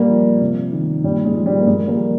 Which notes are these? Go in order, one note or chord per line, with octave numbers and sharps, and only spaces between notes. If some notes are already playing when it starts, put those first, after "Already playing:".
Already playing: A#2 G3 A#3
F3
C3
D#3
A#2 G3
G#3
F3
G3
A#3
A#2 G#3
G3 A#3
F3